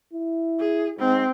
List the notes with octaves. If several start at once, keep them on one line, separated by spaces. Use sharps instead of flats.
E4
G#4
G#2 C4